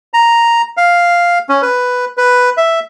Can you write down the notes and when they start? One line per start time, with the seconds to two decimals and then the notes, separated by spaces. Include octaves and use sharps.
0.14 A#5
0.77 F5
1.49 C#4
1.62 B4
2.17 B4
2.57 E5